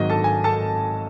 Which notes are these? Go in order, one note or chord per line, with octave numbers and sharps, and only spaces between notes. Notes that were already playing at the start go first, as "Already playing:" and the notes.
Already playing: G#1 G#2 D#3 F#3 D#5
A4 A5
G#5
A4 A5